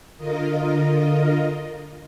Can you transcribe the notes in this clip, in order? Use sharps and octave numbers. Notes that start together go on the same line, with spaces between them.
D3 F4 A#4 D#5